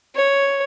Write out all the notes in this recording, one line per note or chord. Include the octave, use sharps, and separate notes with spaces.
C#5